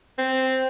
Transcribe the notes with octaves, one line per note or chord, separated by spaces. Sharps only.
C4